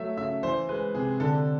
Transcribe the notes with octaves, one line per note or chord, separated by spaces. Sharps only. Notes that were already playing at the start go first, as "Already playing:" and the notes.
Already playing: F#3 A3 E5
C#3 E5
E3 C5
G#3 B4
C3 G#4
D3 A4